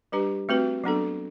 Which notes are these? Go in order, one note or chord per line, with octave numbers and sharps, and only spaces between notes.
G3 D4 G4 B4
A3 C4 F#4 B4
F#3 B3 D4 A4